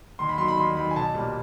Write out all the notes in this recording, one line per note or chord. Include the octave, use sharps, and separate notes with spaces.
D#2 C6
B5
D#3 F#3 C6
B5
D#2 C6
D#3 F#3 B5
G#5
B1 A5
A#2 G3